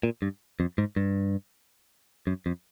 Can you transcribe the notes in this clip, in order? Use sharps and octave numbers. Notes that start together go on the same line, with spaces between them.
A#2
G2
F2
G#2
G2
F#2
F2